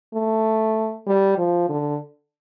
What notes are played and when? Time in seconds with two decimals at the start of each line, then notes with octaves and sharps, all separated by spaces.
0.14 A3
1.07 G3
1.38 F3
1.69 D3